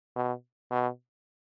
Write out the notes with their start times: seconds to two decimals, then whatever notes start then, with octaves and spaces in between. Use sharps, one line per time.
0.16 B2
0.71 B2